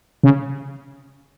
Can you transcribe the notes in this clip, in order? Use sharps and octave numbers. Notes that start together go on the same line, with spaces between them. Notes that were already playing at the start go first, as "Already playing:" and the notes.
C#3